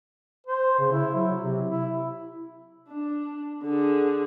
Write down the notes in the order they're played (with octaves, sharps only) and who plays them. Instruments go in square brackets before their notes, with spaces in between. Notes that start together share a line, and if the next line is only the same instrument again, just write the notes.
[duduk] C5
C#3
E4
F#3
C3
E4
[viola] D4
D3 G#4